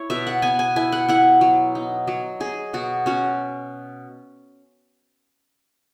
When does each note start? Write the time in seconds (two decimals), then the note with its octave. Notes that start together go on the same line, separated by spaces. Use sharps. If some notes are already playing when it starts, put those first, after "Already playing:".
Already playing: E4 C#5
0.10 B2 E5
0.27 F#5
0.42 B3 G#5
0.59 G#5
0.76 E4 G#5
0.92 F#5
1.09 E4 F#5
1.41 F#3
1.75 D#4
2.07 F#3
2.40 D#4 G#4
2.73 B2 F#4
3.06 C#4 F#4